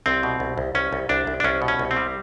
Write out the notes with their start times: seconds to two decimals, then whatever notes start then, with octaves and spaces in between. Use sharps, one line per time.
0.06 C2 C4
0.23 B2
0.40 C2
0.58 C2
0.75 C2 C#4
0.93 C2
1.09 C2 D4
1.27 C2
1.40 D4
1.44 C2 C#4
1.62 B2
1.68 C#4
1.79 C2
1.91 C4
1.97 G3